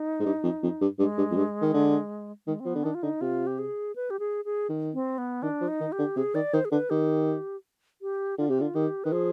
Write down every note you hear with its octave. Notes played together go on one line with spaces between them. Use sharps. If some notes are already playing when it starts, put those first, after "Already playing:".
Already playing: D#4
G#2
G2
F2
F2
G2
G2 G#3
G2
F2
G2
D#3
D3
D#3 G#3
C4
F3 B3
D3
D#3 D4
F4
D3 D#4
C3 F4
G4
G#4
B4
G4
G#4
G#4
D#3
C4
B3
D#3 D4
F3
D#4
D#3
G4
D3
C3 G#4
D#3 D5
D#3 C5
G#4
D3 B4
D#3 G4
G4
D3 F4
C3 G4
D3 F4
D#3 G4
D#3 B4
F3 G#4